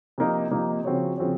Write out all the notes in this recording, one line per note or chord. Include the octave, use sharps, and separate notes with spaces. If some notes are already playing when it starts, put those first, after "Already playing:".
C3 F3 A#3 D#4
C3 F3 A#3 D#4
C#3 F3 C4 F#4 C#5
C#3 F3 C4 F#4 C#5